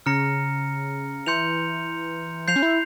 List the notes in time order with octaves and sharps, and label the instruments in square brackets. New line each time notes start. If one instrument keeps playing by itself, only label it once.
[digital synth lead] C#3 [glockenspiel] A#5 F6 A#6 C#7
[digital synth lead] E3 [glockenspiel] C6 G6 C#7 F7
[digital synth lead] F3 [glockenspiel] G6 C7 F7
[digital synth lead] C#4
E4